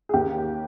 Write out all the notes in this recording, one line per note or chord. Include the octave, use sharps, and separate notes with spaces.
G#4
D#2 G4